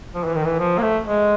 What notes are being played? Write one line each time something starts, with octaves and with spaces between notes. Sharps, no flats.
F3
E3
D#3
E3
F3
A#3
A3
G#3